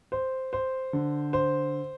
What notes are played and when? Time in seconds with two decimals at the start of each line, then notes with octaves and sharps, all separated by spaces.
0.12 C5
0.53 C5
0.93 D3
1.33 C5